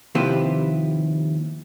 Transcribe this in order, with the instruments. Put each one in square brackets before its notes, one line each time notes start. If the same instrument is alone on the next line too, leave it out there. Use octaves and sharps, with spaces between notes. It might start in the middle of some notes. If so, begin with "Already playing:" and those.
[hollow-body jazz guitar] D#2 C3 F3 E4 G4 B4